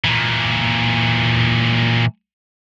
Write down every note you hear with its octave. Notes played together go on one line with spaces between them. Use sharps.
A#2 E3